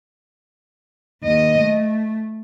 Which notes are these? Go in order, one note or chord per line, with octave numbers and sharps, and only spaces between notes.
D#2 D#5
A3